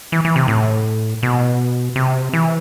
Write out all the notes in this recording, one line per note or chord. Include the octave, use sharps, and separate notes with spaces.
E3
E3
C3
A2
B2
C3
E3